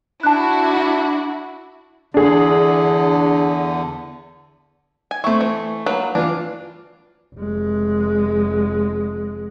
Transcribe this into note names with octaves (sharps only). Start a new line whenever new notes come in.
D4 E4 F#4 A5 F#6
E2 D3 D4 G#4
G#5
A3 E4 C5 C#6
E3
F#3 A#3 B4
E3 D4 F4
F1 G#3